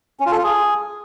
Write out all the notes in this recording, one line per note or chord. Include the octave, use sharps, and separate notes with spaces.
C#4
F4
A4
F4
G#4